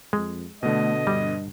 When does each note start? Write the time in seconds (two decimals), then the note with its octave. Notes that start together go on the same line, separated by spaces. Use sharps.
0.13 F2 G#3
0.63 B2 D3 A3 D#5
1.07 G2 G3